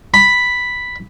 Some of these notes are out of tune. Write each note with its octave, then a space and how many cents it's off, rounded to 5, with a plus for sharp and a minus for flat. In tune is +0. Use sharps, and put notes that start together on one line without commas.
B5 +0